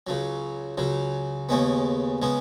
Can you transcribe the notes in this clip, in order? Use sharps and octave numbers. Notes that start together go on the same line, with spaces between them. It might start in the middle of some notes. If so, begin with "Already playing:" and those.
C#2 C#3 F#3
C#2 C#3 F#3
D#2 C#3 G#3 B3
C#3 G#3 B3